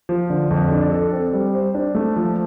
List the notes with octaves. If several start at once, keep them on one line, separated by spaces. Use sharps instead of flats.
F3
D3
F2
D4
A4
C4
G3
C5
D4
A3
F3